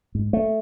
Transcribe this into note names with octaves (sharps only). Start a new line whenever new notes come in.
G#2
A3